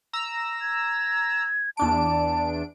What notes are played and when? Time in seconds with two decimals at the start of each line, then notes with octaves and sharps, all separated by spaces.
0.13 A#5 E6
0.61 G#6
1.77 E2 D4 A5 D7